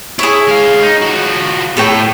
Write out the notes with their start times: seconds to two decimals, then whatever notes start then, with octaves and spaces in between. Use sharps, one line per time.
0.19 E4 G#4 C#5
0.48 G#3 F5
0.82 D#4
1.02 F3 F#4
1.77 A2 A4 C#5 G5